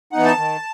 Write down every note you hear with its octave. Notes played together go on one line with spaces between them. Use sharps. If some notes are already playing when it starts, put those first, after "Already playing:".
E3 B3 D#4 F#5
A5
D#3